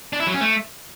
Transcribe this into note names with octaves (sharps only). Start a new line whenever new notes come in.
D4
E4
F#3
C#4
A3